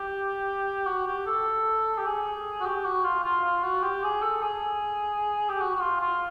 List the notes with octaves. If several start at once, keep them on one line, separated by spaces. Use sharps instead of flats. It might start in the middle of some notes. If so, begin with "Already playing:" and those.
Already playing: G4
F#4
G4
A4
G4
G#4
F#4
G4
F#4
F4
F4
F4
F#4
G4
G#4
A4
G#4
G4
F#4
F#4
F4
F4